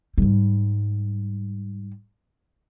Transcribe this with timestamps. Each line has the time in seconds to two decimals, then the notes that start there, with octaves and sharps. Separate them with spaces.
0.18 G#2 G3